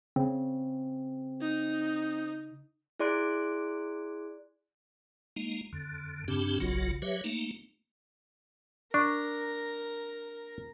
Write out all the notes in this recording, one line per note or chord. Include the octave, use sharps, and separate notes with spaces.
C#3 C4
D#4
E4 G#4 D5 C6 F#6 D7
G#3 A#3 D#4
F2 D3
G2 C#3 C4 D4 G4
F#1 B1 C#3 F#3 F4 F#4
F#3 G4 B4 C#5 E5
A3 A#3 D#4
D4 A#4 C#6